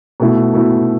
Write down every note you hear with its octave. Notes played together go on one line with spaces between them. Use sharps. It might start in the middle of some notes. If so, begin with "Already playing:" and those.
B2 A3 E4
B2 A3 E4